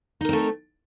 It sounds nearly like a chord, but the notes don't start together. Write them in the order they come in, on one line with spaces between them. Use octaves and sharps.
D#4 A#4 C4 A3